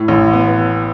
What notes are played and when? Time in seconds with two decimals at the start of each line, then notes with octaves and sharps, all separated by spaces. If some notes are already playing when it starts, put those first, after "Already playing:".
Already playing: A2
0.08 A1
0.33 B3